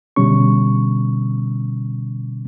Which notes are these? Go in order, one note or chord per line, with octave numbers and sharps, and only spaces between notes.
B2 D3 G3 C#4 C#6